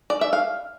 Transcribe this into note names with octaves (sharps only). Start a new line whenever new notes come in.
D5
E5
F5